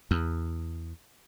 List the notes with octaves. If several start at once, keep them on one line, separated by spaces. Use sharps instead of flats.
E2